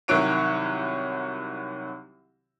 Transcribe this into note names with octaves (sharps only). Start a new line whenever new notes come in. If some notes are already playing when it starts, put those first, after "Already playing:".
C2 D#3 F#3 F#4 C#5 D7